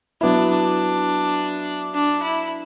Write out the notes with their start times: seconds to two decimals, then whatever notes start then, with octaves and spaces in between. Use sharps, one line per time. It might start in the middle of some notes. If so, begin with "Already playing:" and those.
0.21 F#3 B3 D4 E4
0.50 D4
1.94 D4
2.22 E4